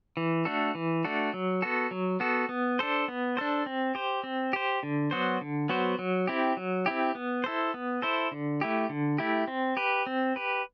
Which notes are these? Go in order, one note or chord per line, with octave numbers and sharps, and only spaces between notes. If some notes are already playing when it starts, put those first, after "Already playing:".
E3
A3 D4 F#4 A4
E3
A3 D4 F#4 A4
F#3
B3 F#4 A4
F#3
B3 F#4 A4
B3
D4 A4 C5
B3
D4 A4 C5
C4
G4 C5
C4
G4 C5
D3
F#3 B3 F#4 C5
D3
F#3 B3 F#4 C5
F#3
C4 E4 G4
F#3
C4 E4 G4
B3
E4 A4 C5
B3
E4 A4 C5
D3
A3 E4 G4
D3
A3 E4 G4
C4
G4 B4
C4
G4 B4